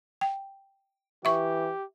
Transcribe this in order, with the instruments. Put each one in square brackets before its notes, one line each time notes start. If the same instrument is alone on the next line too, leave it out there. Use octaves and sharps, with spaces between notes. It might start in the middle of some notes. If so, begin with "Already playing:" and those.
[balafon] G5
[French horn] E3 [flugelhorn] G4 [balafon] E5 C#6